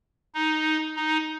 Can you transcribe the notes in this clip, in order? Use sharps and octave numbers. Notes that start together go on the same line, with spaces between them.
D#4
D#4